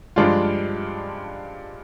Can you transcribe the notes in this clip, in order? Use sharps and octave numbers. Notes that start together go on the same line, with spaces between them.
G2 F3 G#3 D4 F4